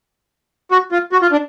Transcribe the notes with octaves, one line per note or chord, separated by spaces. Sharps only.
F#4
F4
F#4
F4
D4